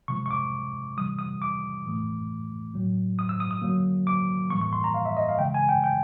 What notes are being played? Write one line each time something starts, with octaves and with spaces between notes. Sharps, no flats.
C3 F3 G#3 C#6
C#6
D6
C3 E3 G3 D#6
D#6
D6
A2 E3 A3
A2 F#3 A#3
D#6
E6
D#6
D#6
D3 F#3 A#3
D6
A2 E3 G3 A#3 C#6
C#6
C6
A#5
F5
E5
D#5
F5
C#3 E3 G#3 G5
G#5
G5
G5